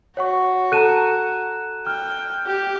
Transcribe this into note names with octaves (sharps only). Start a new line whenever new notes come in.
F#4 C#5 F#5 C#6
A4 A5 A#5 F#6 D#7 E7
G5 F6
G4